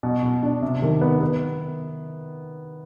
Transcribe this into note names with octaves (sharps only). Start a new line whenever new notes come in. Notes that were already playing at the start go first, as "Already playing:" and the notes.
B2
B2
D4
C3
D#3
B3
B3